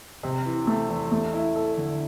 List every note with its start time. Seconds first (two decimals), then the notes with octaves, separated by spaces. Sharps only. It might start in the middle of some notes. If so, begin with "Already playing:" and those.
0.23 C3
0.46 E3
0.67 A3
0.89 E2
1.12 A3
1.34 E4
1.56 A4
1.77 D3